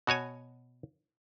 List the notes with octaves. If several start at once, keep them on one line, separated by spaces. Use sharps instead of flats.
B2 F#4 C#5 G#5